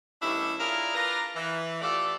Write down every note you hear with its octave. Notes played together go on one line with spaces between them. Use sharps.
G2 D#3 A3 C#4 D4 E4
D4 E4 F4 G#4 A#4
F4 A#4 B4 D5 A#5
E3
A3 F4 G4 A4 D5